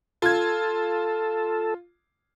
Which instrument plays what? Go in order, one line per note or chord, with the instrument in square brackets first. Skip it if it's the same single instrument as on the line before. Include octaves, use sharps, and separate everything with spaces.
[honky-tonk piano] F4 G#6 [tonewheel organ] A4